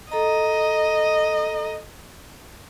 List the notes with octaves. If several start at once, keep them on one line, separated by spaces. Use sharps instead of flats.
A4 D#5 A#5